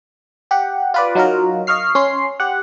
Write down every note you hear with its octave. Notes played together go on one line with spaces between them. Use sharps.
G4 F#5
F4 B4 D5
F#3 D#4 F4 F#4 A#4
D#5 F5 C#6 F6 C7
C#4 C6 C7
G4 F#5